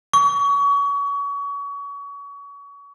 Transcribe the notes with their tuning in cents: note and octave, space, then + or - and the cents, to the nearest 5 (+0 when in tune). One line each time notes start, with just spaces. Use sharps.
C#6 +30